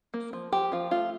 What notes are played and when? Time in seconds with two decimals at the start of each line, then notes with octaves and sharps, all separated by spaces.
0.14 A#3
0.33 F3
0.53 F3 G4
0.72 F3 F4
0.91 A3 F4